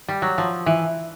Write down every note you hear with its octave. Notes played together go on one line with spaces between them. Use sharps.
G3
F#3
F3
E3